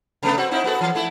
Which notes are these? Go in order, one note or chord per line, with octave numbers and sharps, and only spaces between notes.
C3 A3 B3
C4 F#4
C4 D#4 E4
B3 F#4 A4
E3
A3 E4